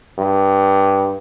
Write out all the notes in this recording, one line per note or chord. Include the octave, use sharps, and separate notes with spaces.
G2